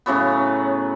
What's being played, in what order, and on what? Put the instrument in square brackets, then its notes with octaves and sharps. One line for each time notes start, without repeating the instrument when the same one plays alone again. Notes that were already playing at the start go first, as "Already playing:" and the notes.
[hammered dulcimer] A2 C#3 F#3 B3